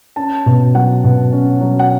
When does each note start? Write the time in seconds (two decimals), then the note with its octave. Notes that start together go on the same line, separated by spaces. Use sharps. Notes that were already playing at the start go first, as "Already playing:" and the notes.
0.16 C#4 A5
0.46 B2
0.75 F#3 F#5
1.04 B2
1.33 C#4
1.61 F#3
1.79 F#5